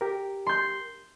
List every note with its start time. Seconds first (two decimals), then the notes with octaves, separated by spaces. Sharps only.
0.01 G4 A#4
0.47 C6 G6